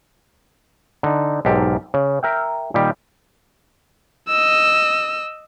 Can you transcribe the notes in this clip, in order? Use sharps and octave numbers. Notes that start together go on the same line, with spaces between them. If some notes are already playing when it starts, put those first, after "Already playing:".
D3 D#4
B1 G#2 G4 A4 A#4
C#3
A#4 E5 G5
A#2 D#3 G3 G4
D#5 E6